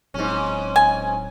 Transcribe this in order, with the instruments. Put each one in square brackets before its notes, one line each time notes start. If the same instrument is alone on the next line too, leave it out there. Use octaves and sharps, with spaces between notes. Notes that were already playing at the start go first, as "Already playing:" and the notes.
[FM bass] D1 [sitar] G#2 C#4
[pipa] G#5